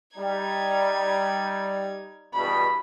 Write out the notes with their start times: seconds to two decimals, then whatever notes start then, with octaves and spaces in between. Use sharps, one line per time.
0.17 G3 D#4 G#6
2.34 E2 G2 B2 B5